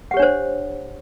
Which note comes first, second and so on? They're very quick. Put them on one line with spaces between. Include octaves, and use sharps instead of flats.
F#5 G4 C#5 D4 C5